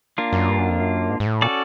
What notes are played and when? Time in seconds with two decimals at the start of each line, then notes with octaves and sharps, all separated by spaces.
0.18 A#3 D4 F4
0.33 F#2
0.49 G2
0.59 F#2
0.70 F2
0.80 F#2
1.10 G#2
1.20 G#2
1.26 A2
1.42 A#2 C#4 F#4 A4 D5